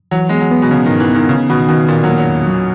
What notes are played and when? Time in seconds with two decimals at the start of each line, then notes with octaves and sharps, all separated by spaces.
0.11 E3 F#3
0.29 G#3 B3
0.41 F#3
0.51 B3
0.62 B2
0.70 C#3 B3
0.85 G#2 D#3
1.00 E3
1.09 B3
1.15 D#3
1.29 C#3 D#4
1.50 B2 D#3
1.68 B2 D#3
1.88 A#2 D#3
2.04 F#3 A#3
2.18 F#3
2.28 E2
2.47 F#3